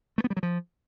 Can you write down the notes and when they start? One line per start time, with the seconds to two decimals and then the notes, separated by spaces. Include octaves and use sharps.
0.18 A3
0.24 B3
0.30 G3
0.37 F#3
0.43 F3